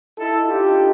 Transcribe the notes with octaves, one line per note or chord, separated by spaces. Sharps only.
D#4 E4 A4
D4 D#4 F4 G4